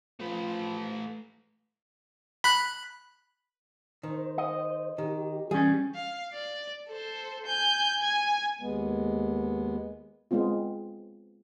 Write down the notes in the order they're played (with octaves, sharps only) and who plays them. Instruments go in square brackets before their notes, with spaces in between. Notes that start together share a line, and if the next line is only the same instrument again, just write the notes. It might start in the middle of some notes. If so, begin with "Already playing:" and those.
[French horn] F3 [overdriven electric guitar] A3 B4
[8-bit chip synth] B5 F#6
[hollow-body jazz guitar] D#3 [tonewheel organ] C5
[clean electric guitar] D#5
[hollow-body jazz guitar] D#3 [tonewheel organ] G4
[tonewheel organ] E3 [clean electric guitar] G3 C#4 [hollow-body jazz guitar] G#4
[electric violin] F5
D5
A4 C5
G#5 G6
G#5 G#6
[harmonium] D#2 G#3 B3
[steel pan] G#3 B3 C4 F4